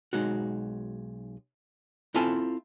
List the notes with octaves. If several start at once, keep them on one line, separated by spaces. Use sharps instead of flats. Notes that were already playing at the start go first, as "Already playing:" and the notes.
B1 G#3 D#4 F#4
C4 E4 F4 A4 G#5 A5